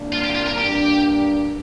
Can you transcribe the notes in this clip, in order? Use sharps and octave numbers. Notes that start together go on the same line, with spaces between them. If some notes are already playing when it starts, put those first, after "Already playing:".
Already playing: C2 A#2 A#3 D4
F4
G4
F4
A#4
G2 G3 A#3 D4 G4